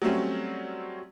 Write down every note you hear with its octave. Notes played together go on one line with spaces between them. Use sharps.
F#3 G3 A3 C4 C#4